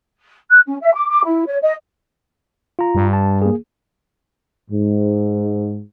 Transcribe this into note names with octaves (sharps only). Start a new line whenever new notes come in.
F#6
C#4
E5
D6
D6
E4
C#5
D#5
F4 A#5
G2
A5
A#3 G#4
G#2